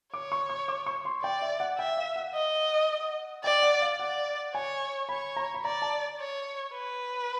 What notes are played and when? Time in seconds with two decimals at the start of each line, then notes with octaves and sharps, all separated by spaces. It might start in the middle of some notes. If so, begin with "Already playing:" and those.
0.13 C#5 D6
0.32 C#6
0.50 C#6
0.68 D6
0.86 C#6
1.05 C6
1.23 D5 G5
1.42 E5
1.60 F#5
1.78 E5 G5
1.97 F5
2.16 F#5
2.34 D#5
3.44 D5 G5
3.62 F#5
3.81 F5
3.99 D5 F#5
4.54 C#5 G#5
5.09 C#5 B5
5.37 A#5
5.54 B5
5.64 D5 A#5
5.82 A5
6.19 C#5
6.74 B4